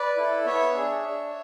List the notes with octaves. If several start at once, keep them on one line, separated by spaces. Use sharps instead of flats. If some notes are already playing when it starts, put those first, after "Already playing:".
Already playing: B4 D5
E4 A4
B3 C#5 E5
D4 G#4
D4